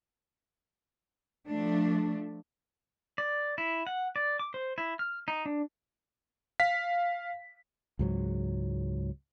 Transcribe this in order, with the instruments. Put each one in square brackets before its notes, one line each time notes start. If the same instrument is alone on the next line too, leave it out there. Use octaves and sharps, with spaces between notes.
[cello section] F3 A3 D4
[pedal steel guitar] D5
E4
F#5
D5
D6
C5
E4
F6
D#4
D4
[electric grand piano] F5 B6
[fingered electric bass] C#2 G#2 F#3